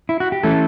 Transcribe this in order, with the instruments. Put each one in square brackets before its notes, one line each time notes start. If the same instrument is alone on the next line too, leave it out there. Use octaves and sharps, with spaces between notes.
[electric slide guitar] E4
F#4
G4
E3 A3 C#4 E4 A4